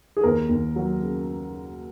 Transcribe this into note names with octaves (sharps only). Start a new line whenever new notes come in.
G#4
D#2 A#4
D#2
F#3
C#3